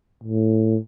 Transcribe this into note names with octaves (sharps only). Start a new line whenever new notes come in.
A2